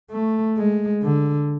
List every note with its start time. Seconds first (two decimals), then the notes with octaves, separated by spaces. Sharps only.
0.11 A3
0.57 G#3
1.03 D3